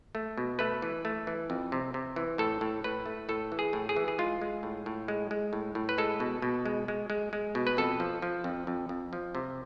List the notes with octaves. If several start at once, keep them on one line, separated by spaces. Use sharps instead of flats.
A3
B2
A3 B4
E3
A3
E3
F2
C3
C3
E3
A2 A4
A2
A2 B4
A3
A2 A4
E3
G#4
A2
G#4
E3
G#4
G#3 F4
G#3
A2
A2
G#3
G#3
A2
A2
B4
G#3 A4
B2
B2
G#3
G#3
G#3
G#3
B2
B4
F2 A4
F3
F3
F2
F2
F2
F3
C3